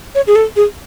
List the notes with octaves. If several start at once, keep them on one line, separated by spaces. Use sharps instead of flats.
C#5
G#4
A4
G#4